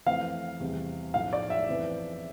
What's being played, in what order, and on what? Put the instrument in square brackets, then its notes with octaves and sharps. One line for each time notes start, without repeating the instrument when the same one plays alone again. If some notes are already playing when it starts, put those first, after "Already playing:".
[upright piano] F2 E3 A3 [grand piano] F5
[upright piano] E2 C3 G3
[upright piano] B1 A2 F3 [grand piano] F5
[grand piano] D5
E5
[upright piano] F2 E3 B3